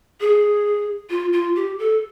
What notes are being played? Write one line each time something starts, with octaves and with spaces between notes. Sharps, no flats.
G#4
F4
F4
G4
A4